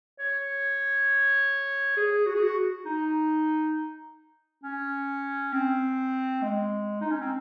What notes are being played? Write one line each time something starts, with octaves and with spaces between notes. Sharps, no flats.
C#5
G#4
F#4
G#4
F#4
D#4
C#4
C4
G#3
D#4
C#4
C4